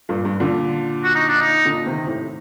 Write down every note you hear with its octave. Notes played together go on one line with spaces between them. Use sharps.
G2 A#2
G2
A#2 D3
F#4
D#4
D4
D#4
A#2 D3
C3 D#3
A2 C3